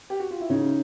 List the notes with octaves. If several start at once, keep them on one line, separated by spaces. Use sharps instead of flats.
G4
F#4
F4
E4
C#3 C#4 D#4